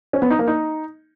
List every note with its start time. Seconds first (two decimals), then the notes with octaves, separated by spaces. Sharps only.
0.13 C#4
0.22 B3
0.30 D#4
0.39 A#3
0.48 D#4